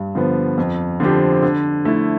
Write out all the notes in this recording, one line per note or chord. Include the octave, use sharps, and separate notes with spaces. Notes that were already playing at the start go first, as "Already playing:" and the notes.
Already playing: G2
D3 F3 B3
F2
D3 F3 C4 G4
D3
A3 E4